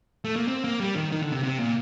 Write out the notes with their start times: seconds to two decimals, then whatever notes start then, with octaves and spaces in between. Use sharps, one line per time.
0.24 A3
0.36 A#3
0.48 C4
0.64 A#3
0.80 G3
0.96 D#3
1.12 D#3
1.22 D3
1.32 C3
1.44 C3
1.59 A#2